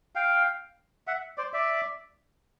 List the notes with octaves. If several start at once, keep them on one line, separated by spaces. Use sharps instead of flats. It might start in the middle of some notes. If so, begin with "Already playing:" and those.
F5 G5
E5 F#5
C5 D5
D5 E5